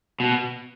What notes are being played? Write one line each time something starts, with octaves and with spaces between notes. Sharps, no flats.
B2